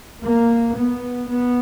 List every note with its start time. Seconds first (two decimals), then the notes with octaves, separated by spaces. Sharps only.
0.23 A#3
0.76 B3
1.31 B3